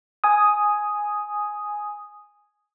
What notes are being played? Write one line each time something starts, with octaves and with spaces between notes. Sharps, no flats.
G#5 D#6